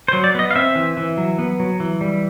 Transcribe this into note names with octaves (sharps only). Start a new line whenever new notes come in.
C5
F#3
D5
B3 D#5
F5
C4 E5
E3
E3
F#3
B3
F#3
E3
G3